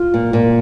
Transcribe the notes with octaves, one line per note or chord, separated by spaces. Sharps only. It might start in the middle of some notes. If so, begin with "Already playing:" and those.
Already playing: F4
A#2
A#2